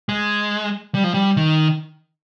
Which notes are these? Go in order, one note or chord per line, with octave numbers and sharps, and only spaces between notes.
G#3
G3
F3
G3
D#3